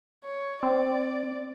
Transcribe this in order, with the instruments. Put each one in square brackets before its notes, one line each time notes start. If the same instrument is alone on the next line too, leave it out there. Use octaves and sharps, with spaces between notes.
[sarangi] C#5
[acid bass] C4 [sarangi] D5